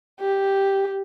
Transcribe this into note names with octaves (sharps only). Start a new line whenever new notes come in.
G4